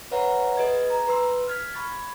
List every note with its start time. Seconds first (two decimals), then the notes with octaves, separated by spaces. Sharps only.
0.11 B4 C#5 E5 F#5 A#5
0.57 G#4 B4 D#5 G#6
0.90 A#5
1.07 B4 C6 E6
1.48 F6 G#6 B6
1.74 B5 C#6 G#6 A6